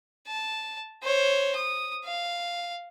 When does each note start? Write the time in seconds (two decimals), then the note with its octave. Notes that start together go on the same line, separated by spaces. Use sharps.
0.28 A5
1.03 C5 C#5
1.55 D#6
2.05 F5